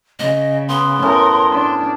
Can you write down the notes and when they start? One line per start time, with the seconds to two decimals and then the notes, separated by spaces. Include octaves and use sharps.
0.19 C#3 D#5
0.69 B3 C6
1.02 A2 B3 C#4 A#4
1.51 D4